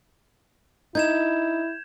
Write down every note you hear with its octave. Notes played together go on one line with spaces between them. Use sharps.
D#4 E4 G6 G#6 E7